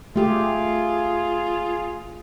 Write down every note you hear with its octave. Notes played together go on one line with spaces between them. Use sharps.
A3 F4 G4 G#4